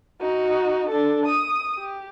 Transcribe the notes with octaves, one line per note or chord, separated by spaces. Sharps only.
D#4 F#4
D4 A4
D#6
G4